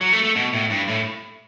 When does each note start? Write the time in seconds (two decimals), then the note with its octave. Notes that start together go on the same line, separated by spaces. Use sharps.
0.01 F#3
0.13 A3
0.23 A3
0.36 B2
0.53 A2
0.70 G2
0.88 A2